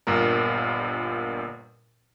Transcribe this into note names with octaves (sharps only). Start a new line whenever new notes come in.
G1 G2 A#2 A#4